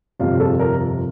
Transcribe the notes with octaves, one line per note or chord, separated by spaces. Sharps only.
G1 F2 C3 F4
A4
A#4